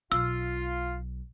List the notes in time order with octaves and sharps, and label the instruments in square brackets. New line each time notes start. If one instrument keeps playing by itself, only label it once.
[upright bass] B1 [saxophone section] F4 [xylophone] E6